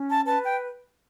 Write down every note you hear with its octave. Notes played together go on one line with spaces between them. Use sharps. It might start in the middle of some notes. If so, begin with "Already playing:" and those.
Already playing: C#4
A5
B4 A5
G5